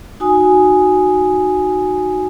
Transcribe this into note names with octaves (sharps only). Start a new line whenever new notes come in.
D#4 F#4 G#5 D#6